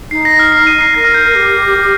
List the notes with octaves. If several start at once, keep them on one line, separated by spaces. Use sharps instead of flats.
D#4 C7
A#6
F6
C7
D#7
C7
A#4 A#6
F6
G6
A#6
G4